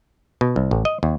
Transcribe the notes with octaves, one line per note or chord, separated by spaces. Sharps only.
B2
C2
A1
D#5
D#2